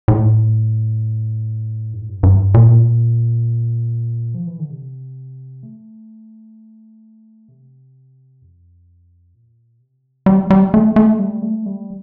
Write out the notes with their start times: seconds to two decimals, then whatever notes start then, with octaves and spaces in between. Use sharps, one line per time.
0.08 A2
1.93 G2
2.01 A2
2.09 G2
2.23 G2
2.54 A#2
4.35 F3
4.47 E3
4.59 D3
4.71 C3
5.63 A3
7.49 C3
8.42 F2
9.34 A#2
9.80 C3
10.26 G3
10.50 G3
10.74 A3
10.96 A3
11.19 G3
11.42 A3
11.66 G3